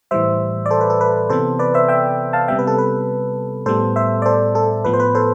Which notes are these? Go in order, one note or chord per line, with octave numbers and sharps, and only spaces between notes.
A2 E3 G3 C5 E5
D5
A4 C5
B4
A4
B4
C3 E3 B3 A4 C5
B4 D5
C5 E5
E5 G5
F5 A5
C3 G3 B3 E5 G5
B4
A4
B4
A2 G3 B3 A4 C5
C5 E5
D5
A4 C5
A4
A2 F3 B3 B4
C5
B4
A4 C5